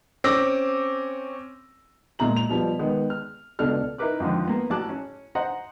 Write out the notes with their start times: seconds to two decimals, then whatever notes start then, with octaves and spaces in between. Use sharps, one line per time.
0.24 C4 C#4 D6 E6 A#6
2.19 A#2 G#3 E5 A#5 F#7
2.37 F7
2.49 B2 F3 G3
2.79 D#3 G#3 B3
3.10 F6
3.59 C#2 B2 B3 D4 A4 F6
3.98 D#4 E4 A#4 B4 D6 F#6
4.20 F2 G#2 D3 D#3 F3
4.47 A#3 B3
4.70 A1 F#3 G#4 A5 D6 F#6
4.89 C#4
5.35 C5 D#5 F#5 A#5